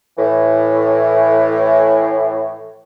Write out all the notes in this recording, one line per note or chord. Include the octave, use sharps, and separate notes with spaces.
A2 E3